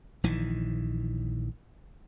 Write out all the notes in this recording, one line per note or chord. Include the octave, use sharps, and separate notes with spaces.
A#1 D#3 E3